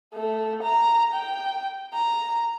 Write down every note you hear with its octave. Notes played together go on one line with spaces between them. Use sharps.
A3
A#5
G5
A#5